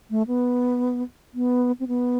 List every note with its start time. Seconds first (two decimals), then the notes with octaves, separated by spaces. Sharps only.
0.10 A3
0.28 B3
1.34 B3
1.80 C4
1.88 B3